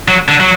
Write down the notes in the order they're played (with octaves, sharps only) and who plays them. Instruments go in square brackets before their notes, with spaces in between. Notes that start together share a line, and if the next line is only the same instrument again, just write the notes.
[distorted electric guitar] F#3
D3
F#3